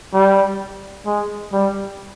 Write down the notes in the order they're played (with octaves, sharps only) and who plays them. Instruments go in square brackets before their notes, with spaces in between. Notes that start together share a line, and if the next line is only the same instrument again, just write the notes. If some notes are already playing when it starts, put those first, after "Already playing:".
[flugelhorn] G3
G#3
G3